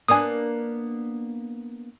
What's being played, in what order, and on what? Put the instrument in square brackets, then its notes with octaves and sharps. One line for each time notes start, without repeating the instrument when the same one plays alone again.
[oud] A#3 B3 D4 [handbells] G#5 D#6